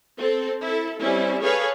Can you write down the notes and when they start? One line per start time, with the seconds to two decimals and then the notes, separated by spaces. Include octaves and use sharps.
0.17 C4 A4
0.62 E4 A4
0.99 G3 C4 C#4 E4
1.42 G#4 A4 B4 C#5 F5